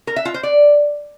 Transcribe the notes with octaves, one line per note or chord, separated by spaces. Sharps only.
A#4
E5
F4
C5
D5